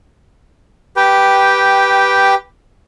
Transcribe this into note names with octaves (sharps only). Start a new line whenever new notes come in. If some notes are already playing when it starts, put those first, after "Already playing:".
G4 B4 G5